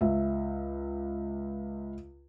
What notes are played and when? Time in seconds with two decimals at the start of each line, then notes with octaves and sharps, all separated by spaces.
0.01 C#2 E5